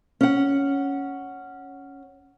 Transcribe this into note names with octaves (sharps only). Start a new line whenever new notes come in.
C#4 F#5